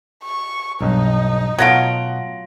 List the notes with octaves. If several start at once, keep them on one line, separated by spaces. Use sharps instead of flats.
C#6
B1 G2 D#4
B2 F#3 A3 F4 F#5 A#6 D7